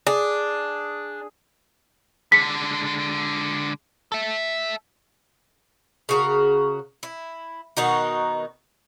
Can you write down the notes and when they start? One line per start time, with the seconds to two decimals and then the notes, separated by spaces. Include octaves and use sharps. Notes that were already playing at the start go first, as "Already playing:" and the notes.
0.07 D4 G#4
2.32 D3 G#3 B6 C#7
4.12 A4 E5
6.09 C#3 F#4 A#4
7.03 E4
7.77 B2 D#3 D#4 F#4